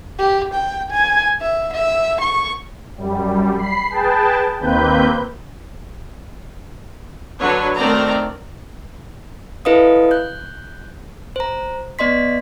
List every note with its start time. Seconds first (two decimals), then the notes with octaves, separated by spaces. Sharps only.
0.18 G4
0.54 G5
0.91 G#5
1.41 E5
1.73 E5
2.21 C#6
2.97 F#2 G3
3.57 B5 C7
3.90 G#4 B4 G5 A5
4.60 D#2 D#3 A#3 C4 B4 G6
7.40 D3 F#3 F#4 B4 C#5
7.76 D#3 A3 C4 A#4 D5 A#5
9.65 E4 A4 B4 D#5 F5 D#6
10.11 F#6 G6
11.36 C5 A#5
11.99 B3 D5 D#5 C6 B6